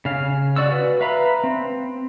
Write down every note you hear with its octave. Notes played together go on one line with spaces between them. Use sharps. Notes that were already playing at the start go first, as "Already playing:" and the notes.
C#3 F5
F#4 D5 C#6 E6
F#4 B4
B4 E5 F5 A#5 B5
C4